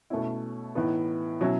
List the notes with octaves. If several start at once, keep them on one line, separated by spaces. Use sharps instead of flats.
B2 A3 C#4 E4
A2 E3 B3 D#4
B2 F#3 C#4 E4